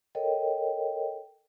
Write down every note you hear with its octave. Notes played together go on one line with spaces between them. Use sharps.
A4 A#4 C#5 D#5 G5